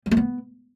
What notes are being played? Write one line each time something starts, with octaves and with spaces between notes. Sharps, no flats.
G3
A3
B3